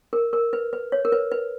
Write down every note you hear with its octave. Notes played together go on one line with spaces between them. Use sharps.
A#4
A#4
B4
B4
C#5
A#4
B4
B4